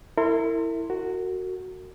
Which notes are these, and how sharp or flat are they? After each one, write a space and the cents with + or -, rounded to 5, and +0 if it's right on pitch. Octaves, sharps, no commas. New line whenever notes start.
E4 +0 A#4 -40 C6 +0
F#4 +0 A#4 -40